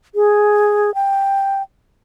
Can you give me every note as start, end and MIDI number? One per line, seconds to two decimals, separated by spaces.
0.15 0.93 68
0.95 1.62 79